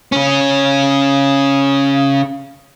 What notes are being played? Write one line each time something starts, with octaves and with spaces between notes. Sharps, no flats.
C#3 C#4